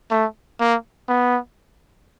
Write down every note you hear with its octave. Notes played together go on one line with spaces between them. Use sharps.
A3
A#3
B3